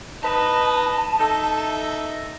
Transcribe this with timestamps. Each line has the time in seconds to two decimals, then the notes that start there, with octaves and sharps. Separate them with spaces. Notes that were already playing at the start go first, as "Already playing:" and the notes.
0.22 D#4 B4 D#5 A5
1.20 D#4 A4 E5